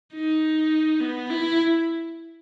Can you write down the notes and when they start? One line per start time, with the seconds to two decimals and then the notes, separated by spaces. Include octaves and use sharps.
0.13 D#4
1.01 B3
1.31 E4